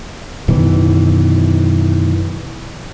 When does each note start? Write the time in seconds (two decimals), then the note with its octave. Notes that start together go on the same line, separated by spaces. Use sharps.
0.48 F#2 B2 D#3 E3